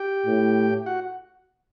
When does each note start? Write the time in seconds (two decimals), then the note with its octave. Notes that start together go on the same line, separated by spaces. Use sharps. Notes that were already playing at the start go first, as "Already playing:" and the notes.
Already playing: G4 G5
0.26 A2
0.86 F#4 F#5